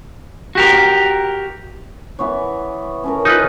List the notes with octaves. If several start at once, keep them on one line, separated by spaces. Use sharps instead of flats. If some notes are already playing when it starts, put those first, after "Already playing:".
F#4 G4 A#4
E3 B3 C#5
C#4 A4 A#4
D#4 F4 B4